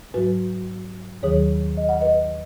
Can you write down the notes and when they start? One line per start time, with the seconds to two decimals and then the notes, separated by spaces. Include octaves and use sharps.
0.14 G#2 F#3 F#4 B4
1.23 D#2 D#3 F#3 G#4 C#5
1.77 D#5
1.89 F#5
2.01 B4 D#5